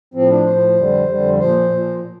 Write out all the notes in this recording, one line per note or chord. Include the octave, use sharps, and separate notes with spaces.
A2 F3 C4
D4
A2 F3 C5
F2 D3 G3
F2 D3 G3
A#2 F3 C5
A#2 F3